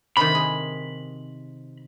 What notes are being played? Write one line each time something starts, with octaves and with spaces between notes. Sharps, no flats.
C3 D#3 B5
G#4